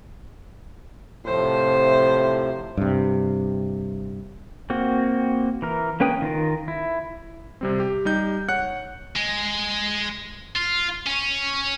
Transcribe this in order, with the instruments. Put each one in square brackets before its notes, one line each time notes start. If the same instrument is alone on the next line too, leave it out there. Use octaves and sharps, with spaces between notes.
[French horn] A2 [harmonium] C3 F3 [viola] C5
[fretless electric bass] G2 C3
[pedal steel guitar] A#3 C4 F#4
E3 A#4
A#3 C#4 B4 G5 D#6
D#3 F4 A#4
E4
[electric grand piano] C3 G3 C4
G4
G3 D#4 G6
C#5 F#5 F#6 C#7
[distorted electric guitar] G#3
F4
C#4